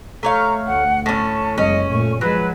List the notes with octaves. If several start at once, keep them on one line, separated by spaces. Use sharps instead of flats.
A3 C#5 F5 A#5
D2 F#5
A2 C#4 A5
F#1 F#2 G#3 C#4 D#5
A#2 A3 C#6
F3 F#3 G#3 B4